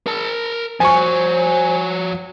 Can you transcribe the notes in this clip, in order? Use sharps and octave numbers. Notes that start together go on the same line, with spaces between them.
A#4 A5
F3 F#4 C5 G#5 C#6